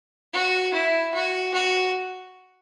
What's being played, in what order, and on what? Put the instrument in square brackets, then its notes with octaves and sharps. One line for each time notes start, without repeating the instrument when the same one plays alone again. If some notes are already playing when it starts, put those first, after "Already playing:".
[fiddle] F#4
E4
F#4
F#4